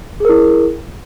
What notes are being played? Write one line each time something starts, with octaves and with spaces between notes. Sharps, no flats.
E4 G#4 A#4